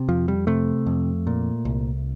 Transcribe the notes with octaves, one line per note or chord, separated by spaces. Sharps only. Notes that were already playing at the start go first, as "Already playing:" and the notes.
Already playing: C3
F2 F3
G3
C3 A3
F2
A#2
C2